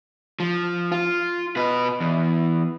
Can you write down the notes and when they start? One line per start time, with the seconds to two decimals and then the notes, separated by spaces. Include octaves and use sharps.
0.40 F3
0.92 F4
1.57 B2 B4
2.01 E2